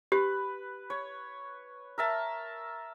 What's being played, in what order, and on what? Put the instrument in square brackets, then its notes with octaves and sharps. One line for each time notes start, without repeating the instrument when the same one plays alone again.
[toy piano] G4 [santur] B4
[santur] C#5
A#4 E5 A5